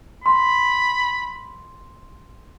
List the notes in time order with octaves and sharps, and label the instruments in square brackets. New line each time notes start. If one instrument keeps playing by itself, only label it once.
[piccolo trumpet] B5 [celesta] C6